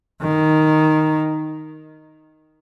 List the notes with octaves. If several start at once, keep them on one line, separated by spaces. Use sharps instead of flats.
D#3